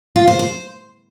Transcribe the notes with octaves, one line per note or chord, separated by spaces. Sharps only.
F4
C5
C5